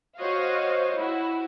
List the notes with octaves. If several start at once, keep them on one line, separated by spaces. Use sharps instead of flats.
F#4 C5 C#5 D#5 F5
E4 F#4